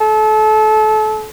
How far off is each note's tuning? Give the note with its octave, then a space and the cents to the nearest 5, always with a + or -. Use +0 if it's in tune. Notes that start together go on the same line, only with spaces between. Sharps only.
A4 -30